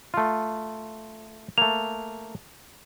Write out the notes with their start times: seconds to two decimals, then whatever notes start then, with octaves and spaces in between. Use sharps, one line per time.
0.14 A3 F4
1.58 A3 A#3 F7